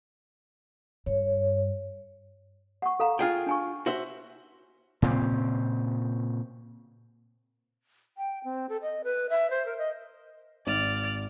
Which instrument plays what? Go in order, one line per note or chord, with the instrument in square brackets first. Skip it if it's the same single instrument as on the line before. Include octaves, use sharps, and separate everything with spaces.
[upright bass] G2 [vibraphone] C#5
[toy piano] F#5 C#6
A4 F5 A#5
[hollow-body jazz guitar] F4 G#4 G5
[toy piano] D4 G#5 C#6
[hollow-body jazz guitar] F#4 C5 E5
[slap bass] A#2 C#3 C4
[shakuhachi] G5
C4
A4
D#5
B4
E5
C5
A#4
D#5
[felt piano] G#1 [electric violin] D5 F6